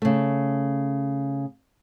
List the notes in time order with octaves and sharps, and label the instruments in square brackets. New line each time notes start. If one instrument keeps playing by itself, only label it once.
[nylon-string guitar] C#3 A3